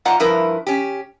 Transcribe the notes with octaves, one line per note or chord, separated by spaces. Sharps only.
G#2 F4 D5 F#5 A#5
G2 F3 E4 A#4 B4
C#4 G4